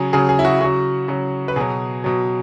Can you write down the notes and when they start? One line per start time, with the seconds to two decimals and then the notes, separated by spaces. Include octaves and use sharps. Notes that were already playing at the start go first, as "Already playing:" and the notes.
Already playing: C#3 F#3 G#4
0.13 C#3 F#3 G#4
0.29 G#4
0.39 E4
0.45 F#4
0.61 C#3 F#3 F#4
1.08 C#3 F#3
1.48 B4
1.56 B2 F#3 G#4
2.04 B2 F#3